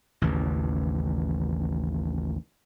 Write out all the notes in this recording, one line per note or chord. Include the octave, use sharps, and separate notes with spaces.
A1 D#2 C#3 E3